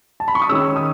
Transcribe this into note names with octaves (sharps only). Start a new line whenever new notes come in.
A5
B5
C#6
D#6
D#3 G#3 C#4 E6
D#6